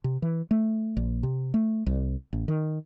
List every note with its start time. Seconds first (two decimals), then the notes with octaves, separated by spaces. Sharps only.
0.04 C3
0.22 E3
0.51 A3
0.97 A#1
1.23 C3
1.54 A3
1.86 C2
2.33 A1
2.48 D#3